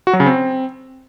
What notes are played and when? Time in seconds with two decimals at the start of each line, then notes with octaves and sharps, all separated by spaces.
0.07 F#4
0.13 F#3
0.20 C#3
0.26 C4